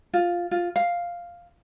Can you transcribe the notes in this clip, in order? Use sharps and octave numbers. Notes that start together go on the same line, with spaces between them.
F4
F4
F5